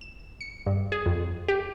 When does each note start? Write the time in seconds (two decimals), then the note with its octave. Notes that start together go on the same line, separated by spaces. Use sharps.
0.01 E7
0.41 C#7
0.66 G2
0.92 G#4
1.06 F2
1.48 G4